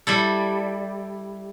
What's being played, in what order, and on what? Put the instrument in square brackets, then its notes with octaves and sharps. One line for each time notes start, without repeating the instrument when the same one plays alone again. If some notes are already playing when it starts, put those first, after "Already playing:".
[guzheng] G3 E4 A4